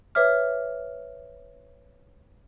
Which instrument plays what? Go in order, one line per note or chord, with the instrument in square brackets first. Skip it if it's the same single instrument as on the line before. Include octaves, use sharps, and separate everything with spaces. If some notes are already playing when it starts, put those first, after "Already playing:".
[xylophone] B4 C#5 E5 D6 F6